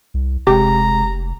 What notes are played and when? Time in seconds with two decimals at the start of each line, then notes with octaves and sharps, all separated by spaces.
0.14 C2
0.47 F1 C3 G#3 G4 A#5